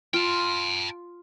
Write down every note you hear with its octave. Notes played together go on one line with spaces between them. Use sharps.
F4 G5 A5